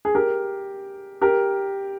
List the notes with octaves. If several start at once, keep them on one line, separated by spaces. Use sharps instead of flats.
G#4
G4 A#4
G4 A#4